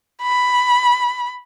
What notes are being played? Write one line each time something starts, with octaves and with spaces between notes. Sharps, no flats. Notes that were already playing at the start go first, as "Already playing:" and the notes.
B5